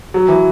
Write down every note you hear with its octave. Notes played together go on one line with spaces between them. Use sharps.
F#3
E3